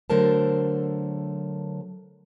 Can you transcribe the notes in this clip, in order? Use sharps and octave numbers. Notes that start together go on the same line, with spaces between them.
D3 F#3 A3 A#4 C5 A5